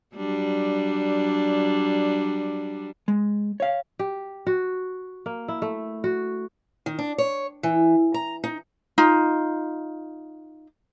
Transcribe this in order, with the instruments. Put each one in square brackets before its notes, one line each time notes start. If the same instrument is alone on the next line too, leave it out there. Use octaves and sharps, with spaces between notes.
[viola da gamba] F#3 G3 D4
[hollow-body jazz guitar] G#3
C#5 F5
[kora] G4
F#4
A#3
E4
A3
F#4
[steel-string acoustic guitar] D#3
D4
C#5
E3
A#5
D#4
[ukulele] D#4 F4